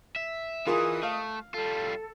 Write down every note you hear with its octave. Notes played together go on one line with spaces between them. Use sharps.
E5
C3 E3 F4 G#4 A#4 D#5 D#6
A3 F5
G3 F4 A4